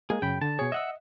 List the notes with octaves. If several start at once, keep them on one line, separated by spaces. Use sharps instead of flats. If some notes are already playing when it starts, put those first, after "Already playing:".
G#3 A#3 G#4
F#2 C#3 G5 B5
D3 A5
B2 G#4 C#5
D#5 E5 F#5 E6